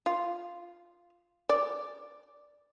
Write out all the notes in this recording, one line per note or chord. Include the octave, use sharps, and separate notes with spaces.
F4
D5